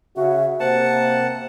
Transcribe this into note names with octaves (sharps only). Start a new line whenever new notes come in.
C#3 F#4 E5
C3 A#3 C5 F#5 A5